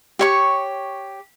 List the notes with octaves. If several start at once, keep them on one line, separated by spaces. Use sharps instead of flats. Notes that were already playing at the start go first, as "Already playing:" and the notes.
G4 C#5 C#6